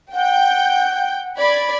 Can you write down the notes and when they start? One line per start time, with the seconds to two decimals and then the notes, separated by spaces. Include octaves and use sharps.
0.13 F#5 G5 G6
1.36 D5 B5 G#6